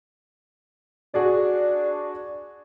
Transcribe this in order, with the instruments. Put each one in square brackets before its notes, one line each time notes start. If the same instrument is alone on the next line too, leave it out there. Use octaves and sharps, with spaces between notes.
[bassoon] D4 [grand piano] F#4 G#4 D5